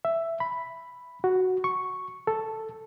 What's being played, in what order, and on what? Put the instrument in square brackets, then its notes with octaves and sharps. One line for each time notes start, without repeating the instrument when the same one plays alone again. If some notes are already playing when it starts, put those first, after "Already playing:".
[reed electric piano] E5
B5
F#4
C#6
A4